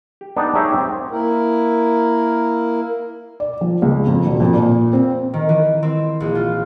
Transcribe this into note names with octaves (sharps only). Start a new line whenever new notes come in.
G4
B3 D4 D#4
D#4 G4 G#4 C#5 D#5 E5
C4
A#3 E4 A#4
D5
F3
C#2
F2
E1
F2
A#2
C4
D#3
E3
C4
A#1
F4